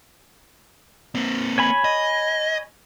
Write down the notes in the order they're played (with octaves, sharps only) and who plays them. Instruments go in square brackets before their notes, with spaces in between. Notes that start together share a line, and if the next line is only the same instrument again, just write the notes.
[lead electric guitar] A#3 C4
[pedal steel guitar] C#5 G#5 B5
[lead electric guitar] D#5